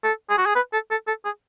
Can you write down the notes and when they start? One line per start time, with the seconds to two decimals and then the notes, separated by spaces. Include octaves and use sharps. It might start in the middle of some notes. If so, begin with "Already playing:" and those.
0.04 A4
0.30 G#4
0.38 F#4
0.46 G#4
0.55 B4
0.73 A4
0.91 A4
1.07 A4
1.25 G#4